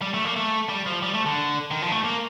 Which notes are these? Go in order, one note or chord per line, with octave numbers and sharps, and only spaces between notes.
G3
A3
A#3
A3
G3
F3
G3
A3
D3
D#3
F3
A3
A#3